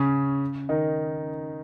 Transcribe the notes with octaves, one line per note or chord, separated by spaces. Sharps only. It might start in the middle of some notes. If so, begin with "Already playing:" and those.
Already playing: C#3 C#4
D#3 D#4